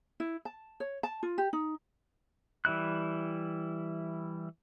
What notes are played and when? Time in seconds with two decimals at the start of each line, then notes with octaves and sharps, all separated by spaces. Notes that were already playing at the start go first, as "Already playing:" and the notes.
0.20 E4
0.45 A5
0.80 C#5
1.03 A5
1.23 F4
1.38 G4
1.53 D#4
2.65 E3 G3 E4 F#6